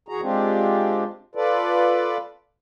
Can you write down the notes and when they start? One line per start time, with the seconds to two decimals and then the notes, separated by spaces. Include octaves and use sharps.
0.08 E2 F#4 G#4 A#5
0.22 G#3 C4 D4 F4 G4
1.35 F4 A4 B4 D5